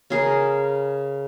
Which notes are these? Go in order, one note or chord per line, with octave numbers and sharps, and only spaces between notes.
C#3 G#4 A#4